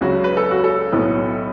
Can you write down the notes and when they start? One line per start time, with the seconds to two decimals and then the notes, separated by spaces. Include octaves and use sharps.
0.01 C#2 C#3 F#3 F#4
0.24 B4
0.37 A4
0.51 F#4
0.64 A4
0.93 B1 A2 F#3 B3